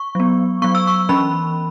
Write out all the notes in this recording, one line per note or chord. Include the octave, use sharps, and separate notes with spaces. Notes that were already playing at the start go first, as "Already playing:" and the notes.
Already playing: C#6
F#3 B3
F#3 B3 C#6
E6
C#6
E3 C#4 B5